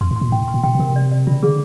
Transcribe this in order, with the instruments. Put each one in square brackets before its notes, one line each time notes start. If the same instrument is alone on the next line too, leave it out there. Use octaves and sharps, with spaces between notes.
[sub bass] F2 [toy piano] C6
[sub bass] A2
[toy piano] C6
[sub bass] A#2
[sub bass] A2 [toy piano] G5
[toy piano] C6
[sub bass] A#2
[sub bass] B2 [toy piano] G5
[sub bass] B2
[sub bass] C3 [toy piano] A#4
[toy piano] D5
D5
[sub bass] C#3 [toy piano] F4
[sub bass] D3 [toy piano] G#4